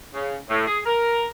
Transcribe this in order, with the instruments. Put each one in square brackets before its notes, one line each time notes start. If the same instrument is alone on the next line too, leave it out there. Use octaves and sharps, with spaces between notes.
[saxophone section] C#3
A2
G#4
A#4